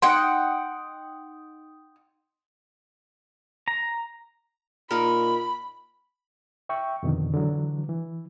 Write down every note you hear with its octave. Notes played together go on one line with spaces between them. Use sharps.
D#4 F#5 G5 C6
A#5
A#2 D#4 A#4 B5
E5 G5 C#6
F2 B2 D3 D#3
D3 E3 F#3
E3